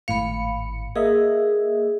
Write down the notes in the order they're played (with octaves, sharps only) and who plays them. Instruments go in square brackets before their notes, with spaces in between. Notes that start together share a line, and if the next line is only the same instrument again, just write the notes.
[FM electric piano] G#1 A2 C#7 [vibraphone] F5 B5
[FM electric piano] A#3 D#5 E5 [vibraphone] G#4